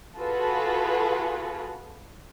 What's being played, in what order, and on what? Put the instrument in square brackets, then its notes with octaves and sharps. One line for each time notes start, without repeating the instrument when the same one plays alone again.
[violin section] F4 F#4 G#4 A4 B4